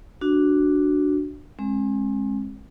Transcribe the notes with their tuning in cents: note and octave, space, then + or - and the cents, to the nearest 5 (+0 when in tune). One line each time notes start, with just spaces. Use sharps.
D4 +0 F#4 +0
G#3 +0 C4 +40